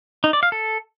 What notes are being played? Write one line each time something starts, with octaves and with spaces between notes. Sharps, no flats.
D#4
D5
F5
A4